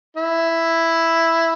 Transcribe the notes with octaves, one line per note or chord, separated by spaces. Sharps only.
E4